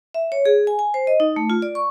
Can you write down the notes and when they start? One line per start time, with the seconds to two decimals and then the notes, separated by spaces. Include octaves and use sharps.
0.14 E5
0.32 C#5
0.45 G#4
0.67 G#5
0.79 G#5
0.94 C5
1.07 D#5
1.20 D#4
1.36 A3
1.50 F4
1.62 D5
1.75 C#6